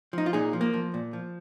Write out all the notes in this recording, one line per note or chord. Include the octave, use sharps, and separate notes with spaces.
F3 D#4
F4
A#2 D#4 G#4
F3
A#3
F3
A#2
F3